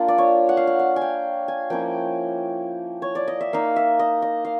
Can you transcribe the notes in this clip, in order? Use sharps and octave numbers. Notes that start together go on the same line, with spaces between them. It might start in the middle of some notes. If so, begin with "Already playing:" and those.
Already playing: A#3 D4 F4
D5
C#5
F#5
F5
F#5
F5
G#5
G5
G#5
F3 A#3 C#4 E4 G5
C#5
D5
D#5
E5
A#3 D#4 F5
E5
D#5
D#5
F5